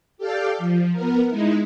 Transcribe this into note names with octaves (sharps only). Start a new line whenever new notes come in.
G4 A4 D5 F5 G5
F3
B3 A#4
G#3 D#4 E4